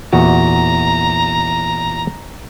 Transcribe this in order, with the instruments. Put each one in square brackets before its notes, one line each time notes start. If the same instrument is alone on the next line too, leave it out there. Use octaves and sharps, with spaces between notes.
[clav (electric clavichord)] E2 A#2 F#4 [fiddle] A#5